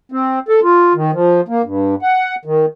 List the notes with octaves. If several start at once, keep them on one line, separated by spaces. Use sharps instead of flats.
C4
A4
F4
D#3
F3
A#3
G2
F#5
D#3